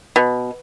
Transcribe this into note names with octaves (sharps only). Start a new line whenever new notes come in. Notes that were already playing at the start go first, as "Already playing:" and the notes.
B2